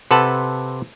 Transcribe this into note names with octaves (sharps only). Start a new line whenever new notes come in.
C3 A4 B4 F#5 A5